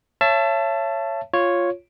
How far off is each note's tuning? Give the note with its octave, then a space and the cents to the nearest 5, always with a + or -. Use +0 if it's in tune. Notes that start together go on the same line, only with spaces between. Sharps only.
C#5 +0 E5 +35 A5 +0
F4 +0 C#5 +0